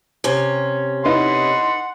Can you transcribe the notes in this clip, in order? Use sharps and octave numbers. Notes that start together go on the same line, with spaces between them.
C3 C#4
D#4 E4 B4 F#5 C6